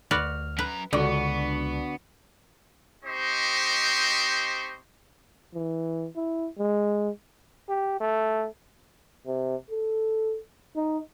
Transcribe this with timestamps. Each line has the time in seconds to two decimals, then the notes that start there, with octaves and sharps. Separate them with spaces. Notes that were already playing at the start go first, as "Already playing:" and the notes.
0.11 D2 F#4 B4 D5 F6
0.59 F#2 B4 A#5
0.93 C#2 D3 B3 D4 F#4 C#6
3.04 C4 D#4 G4 C5 D#5 C#6
5.54 E3
6.16 E4
6.59 G#3
7.69 G4
8.01 A3
9.27 C3
9.70 A4
10.76 D#4